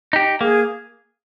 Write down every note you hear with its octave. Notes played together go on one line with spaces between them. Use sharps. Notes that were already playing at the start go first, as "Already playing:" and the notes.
D#4 G4
A#3 G#4